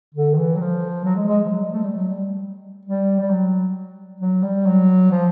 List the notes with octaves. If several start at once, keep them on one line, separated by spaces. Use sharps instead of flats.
D3
D#3
E3
F#3
F3
F#3
G#3
G#3
F3
F#3
G3
A3
G3
F#3
G3
G3
G3
F#3
F#3
G3
F#3
F3